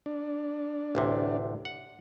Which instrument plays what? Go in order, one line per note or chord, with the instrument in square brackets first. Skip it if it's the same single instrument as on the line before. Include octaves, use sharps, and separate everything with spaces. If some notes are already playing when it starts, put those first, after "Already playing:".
[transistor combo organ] D4
[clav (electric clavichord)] A1 D2 C3
F#5